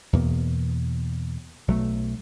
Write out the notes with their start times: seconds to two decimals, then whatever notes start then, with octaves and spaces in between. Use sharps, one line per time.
0.13 E2 B2 A#3
1.68 B1 F#3 A3